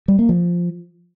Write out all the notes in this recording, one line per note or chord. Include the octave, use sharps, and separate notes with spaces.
G3
A#3
F3